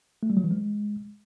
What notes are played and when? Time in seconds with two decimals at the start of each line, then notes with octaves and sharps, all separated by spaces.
0.23 A3
0.30 G3
0.37 F#3
0.44 E3
0.51 G#3